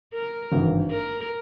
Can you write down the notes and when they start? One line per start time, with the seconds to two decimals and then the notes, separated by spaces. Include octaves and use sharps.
0.13 A#4
0.52 G#1 G2 E3
0.91 A#4